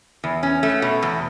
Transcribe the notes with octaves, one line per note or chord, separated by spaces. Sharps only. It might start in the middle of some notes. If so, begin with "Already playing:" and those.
E2
C#4
A3
B2
E2